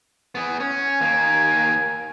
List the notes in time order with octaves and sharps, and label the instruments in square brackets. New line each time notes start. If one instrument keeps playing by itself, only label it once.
[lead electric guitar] B3 G#4
[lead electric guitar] C#4 [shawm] G#5
[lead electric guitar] D#2 A#3